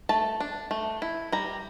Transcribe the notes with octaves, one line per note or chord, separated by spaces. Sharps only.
A3 A5
D4
A3
E4
G3 A#5